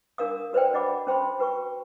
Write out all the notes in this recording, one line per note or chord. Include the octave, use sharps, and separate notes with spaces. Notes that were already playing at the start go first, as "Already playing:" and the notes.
D4 A#4 F5 D#6
F#4 B4 C5 D5 G5
D4 D5 D#5 F#5 B5 D6
C#4 C5 G5 B5 C6
F#4 B4 G5 C#6